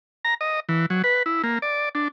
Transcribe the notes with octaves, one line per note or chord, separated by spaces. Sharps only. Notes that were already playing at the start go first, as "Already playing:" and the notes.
A#5
D#5
E3
F#3
B4
E4
A#3
D5
D4